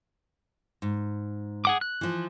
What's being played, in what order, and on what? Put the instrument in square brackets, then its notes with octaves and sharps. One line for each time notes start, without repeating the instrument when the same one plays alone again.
[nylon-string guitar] G#2
[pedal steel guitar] G#4 F#5 D6
F#6
[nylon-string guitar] E3 F3